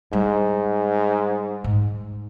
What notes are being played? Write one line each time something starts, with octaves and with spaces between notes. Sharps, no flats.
G#2 G3 D4
G#2